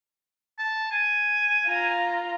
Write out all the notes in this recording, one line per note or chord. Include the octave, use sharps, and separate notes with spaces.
A5
G#5
F4 A#5